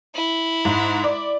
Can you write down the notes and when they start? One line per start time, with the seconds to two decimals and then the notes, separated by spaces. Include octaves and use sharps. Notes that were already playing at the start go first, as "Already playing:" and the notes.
0.15 E4
0.65 G#2
1.04 D5